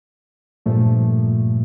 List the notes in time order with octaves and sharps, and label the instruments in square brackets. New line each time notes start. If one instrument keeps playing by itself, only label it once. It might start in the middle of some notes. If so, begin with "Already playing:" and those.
[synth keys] G2 A#2 F3 A3